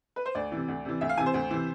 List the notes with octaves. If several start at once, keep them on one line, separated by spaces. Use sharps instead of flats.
B4
C5
D2 D5
C3 E3
D2
C3 E3
D2 E5
F5
C3 E3 G#5
C5
D2
C3 E3